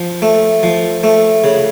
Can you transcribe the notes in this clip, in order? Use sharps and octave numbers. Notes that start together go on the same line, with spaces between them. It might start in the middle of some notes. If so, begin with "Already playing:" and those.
Already playing: F3
A3
F3
A3
C#3